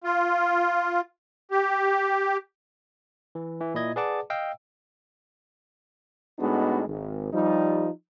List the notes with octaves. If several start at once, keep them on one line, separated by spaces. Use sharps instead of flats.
F4
G4
E3
E3
A#2 E4 D#5 G#6
G#4 B4 D5 F#5 A5 D6
D#5 F5 G5 E6
A2 G#3 B3 D4 D#4 F#4
G#1
F3 G3 D#4